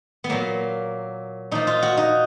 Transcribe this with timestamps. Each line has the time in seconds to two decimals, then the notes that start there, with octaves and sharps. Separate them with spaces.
0.24 B3
0.30 A#2 F#3 A#3
1.51 A#2 F3 D#4
1.67 F4
1.83 F#4
1.97 D#4